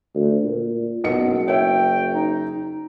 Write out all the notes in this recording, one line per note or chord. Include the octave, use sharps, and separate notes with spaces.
D2
A#2
F#1 B1 B3 D#5 C#7
C#5 E5 G5
D#4